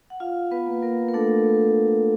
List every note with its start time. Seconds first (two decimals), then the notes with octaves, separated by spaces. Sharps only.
0.10 F#5
0.20 F4 F5
0.51 B3 B4
0.67 A#3
0.82 A#3 A#4
1.09 A#4
1.14 A3 D4 A4